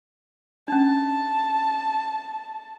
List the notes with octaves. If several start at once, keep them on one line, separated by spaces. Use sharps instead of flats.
C#4 D4 A5